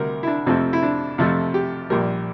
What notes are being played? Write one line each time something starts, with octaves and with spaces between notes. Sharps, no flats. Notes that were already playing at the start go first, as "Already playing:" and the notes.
Already playing: D2 C3 G3 A#4
E4
D4
F2 C3 F3 A3 C4
E4
D4
F2 C3 F3 A3 F4
G4
A#1 A#2 G3 A#4